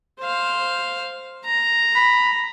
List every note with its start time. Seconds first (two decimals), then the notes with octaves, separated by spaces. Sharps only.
0.20 C5 F5
1.45 A#5
1.95 B5